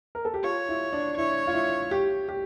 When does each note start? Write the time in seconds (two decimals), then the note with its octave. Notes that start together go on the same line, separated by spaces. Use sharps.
0.15 A#4
0.25 A4
0.34 G4
0.44 F4 C#5
0.69 E4
0.93 D4
1.17 E4 C#5
1.47 F4
1.54 E4
1.91 G4
2.28 G4